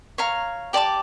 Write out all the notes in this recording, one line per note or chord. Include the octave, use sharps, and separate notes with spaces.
C#5 F5 A#5
G4 D5 A5 D6